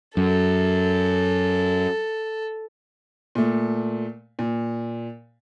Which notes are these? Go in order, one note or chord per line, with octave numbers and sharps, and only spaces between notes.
F#2 A4
A#2 A3
A#2